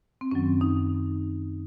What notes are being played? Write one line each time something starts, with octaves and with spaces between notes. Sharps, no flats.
C4
F#2 D#3 F#3 C#4
D#4